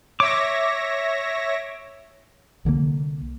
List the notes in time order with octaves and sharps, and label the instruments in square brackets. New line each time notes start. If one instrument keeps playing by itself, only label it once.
[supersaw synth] C#5 E5 A#6 [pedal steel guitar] D6
[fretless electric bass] C2 D3 D#3 A#3